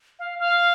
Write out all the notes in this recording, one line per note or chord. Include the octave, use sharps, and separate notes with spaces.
F5
F5